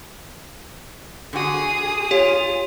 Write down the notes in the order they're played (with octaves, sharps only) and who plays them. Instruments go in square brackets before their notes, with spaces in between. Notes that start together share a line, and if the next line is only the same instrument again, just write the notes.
[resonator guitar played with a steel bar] D3 F#4 [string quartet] G#4 D#6
[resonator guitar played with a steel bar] F4 [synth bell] G4 [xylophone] C#5